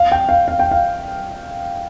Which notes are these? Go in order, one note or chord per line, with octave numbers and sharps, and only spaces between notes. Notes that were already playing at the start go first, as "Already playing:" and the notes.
Already playing: F5
G5
F5
F5
G5
F5